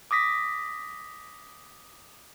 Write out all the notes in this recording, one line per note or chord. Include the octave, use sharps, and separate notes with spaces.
D6 D#6 A#6 B6